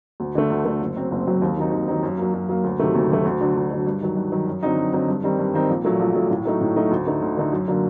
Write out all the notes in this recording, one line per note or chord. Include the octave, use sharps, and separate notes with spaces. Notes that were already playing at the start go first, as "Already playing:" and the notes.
D2
D3 A3
D2
D3 A3
F#1
F#2 F#3 C4
F#1
F#2 F#3 C4
D#2
D#3 F#3 C4 D#4
D#2
D#3 F#3 C4 D#4
F#2
F#3 A#3
F#2
F#3 A#3
D2
C3 D#3 F#3 A3
D2
C3 D#3 F#3 A3
D2
D3 F#3
D2
D3 F#3
G2
D#3 F#3
G2
D#3 F#3
F#2
D3 F#3 C4 D#4
F#2
D3 F#3 C4 D#4
G2
D#3 G3 C4 D#4
G2
D#3 G3 C4 D#4
A#1
A#2 F#3 A3
A#1
A#2 F#3 A3
A2
F#3 A3 D#4
A2
F#3 A3 D#4
D2
D3 A3 D#4
D2
D3 A3 D#4
F#2
D3 F#3 A#3